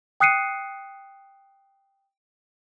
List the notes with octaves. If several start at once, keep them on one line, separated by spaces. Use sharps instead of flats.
G5 D#6 F#6 C7 C#7 D#7